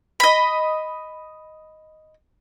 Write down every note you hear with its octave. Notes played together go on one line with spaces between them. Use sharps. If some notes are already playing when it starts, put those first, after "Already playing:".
D#5 B5